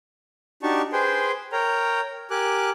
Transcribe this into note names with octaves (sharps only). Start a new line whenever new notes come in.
D4 D#4 F#4 G4 A5 C#6
G#4 B4 C5 G5 G#5 C6
A#4 C#5 G5 A#5
G4 A#4 G#5 D6 F#6